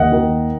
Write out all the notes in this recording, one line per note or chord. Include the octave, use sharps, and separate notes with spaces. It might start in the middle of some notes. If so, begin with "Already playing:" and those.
Already playing: D#2 D#5 F#5
D#3